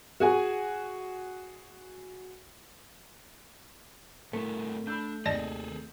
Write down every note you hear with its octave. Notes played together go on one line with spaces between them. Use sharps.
F#4 G#4 G#5
A2 A3 C4 E4 A#4
D4 B5 E6 G6
D#2 C3 G#4 A4 D5 D#5 A5